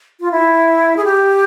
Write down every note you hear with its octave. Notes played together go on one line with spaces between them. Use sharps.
F4
E4
G#4
G4